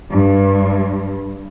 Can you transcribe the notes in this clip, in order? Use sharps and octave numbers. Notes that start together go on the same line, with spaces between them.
G2